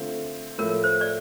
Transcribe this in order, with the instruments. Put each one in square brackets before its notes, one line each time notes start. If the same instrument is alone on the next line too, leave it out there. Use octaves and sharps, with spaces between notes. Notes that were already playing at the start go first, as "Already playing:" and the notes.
Already playing: [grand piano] D3 A3 C4 F4
[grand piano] A2 F3 A3 E4 [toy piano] A#4
[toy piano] C5
D5